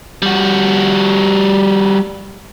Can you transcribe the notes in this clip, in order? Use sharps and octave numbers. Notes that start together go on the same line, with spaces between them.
G3 F#4